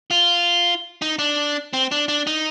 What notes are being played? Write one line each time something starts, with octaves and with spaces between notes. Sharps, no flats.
F4
D#4
D4
C4
D4
D4
D#4